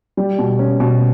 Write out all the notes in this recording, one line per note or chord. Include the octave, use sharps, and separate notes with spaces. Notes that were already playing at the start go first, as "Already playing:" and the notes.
G3
B2
C#4
B2